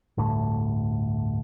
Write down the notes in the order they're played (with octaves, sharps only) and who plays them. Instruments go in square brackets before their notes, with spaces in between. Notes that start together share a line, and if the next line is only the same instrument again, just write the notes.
[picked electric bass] G1 D2 A2 A3